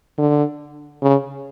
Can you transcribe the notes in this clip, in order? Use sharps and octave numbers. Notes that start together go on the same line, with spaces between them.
D3
C#3